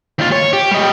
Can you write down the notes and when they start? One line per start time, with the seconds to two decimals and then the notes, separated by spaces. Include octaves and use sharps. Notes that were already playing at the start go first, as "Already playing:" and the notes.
0.19 D#2 F4
0.32 C#5
0.53 G4
0.71 G3 D#5